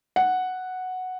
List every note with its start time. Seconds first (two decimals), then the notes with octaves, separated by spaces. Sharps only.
0.16 F#5